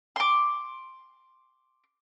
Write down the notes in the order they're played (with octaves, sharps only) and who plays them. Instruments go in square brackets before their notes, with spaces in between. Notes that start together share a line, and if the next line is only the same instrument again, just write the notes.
[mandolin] C6 D6